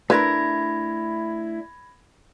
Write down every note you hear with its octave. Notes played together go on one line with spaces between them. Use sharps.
A3 D4 E4 A#4 B4 B5 G#6 A#6